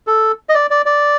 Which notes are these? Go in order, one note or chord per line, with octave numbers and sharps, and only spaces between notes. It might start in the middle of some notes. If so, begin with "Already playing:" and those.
A4
D#5
D5
D5
D5